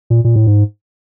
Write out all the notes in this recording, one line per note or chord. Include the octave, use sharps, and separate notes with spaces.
A#2
A#2
A2
G#2